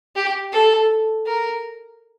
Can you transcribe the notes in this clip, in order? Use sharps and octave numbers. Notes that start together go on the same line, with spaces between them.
G4
A4
A#4